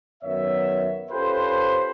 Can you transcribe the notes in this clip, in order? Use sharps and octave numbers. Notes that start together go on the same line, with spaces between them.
F#2 D#3 B3 C#5 E5
C#4 F4 G4 A4 B4 C5